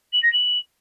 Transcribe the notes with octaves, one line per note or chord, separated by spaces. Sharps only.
F#7
A#6
F#7